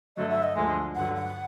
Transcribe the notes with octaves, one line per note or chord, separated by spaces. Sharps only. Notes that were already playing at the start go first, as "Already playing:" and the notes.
G2 D3 F#3 A3 D#5
E5
D#5
D2 D3 F3 G#3
G2 D3 F#3 F#5
F#5